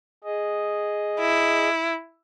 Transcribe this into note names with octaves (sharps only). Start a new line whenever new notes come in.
G#4 D#5
E4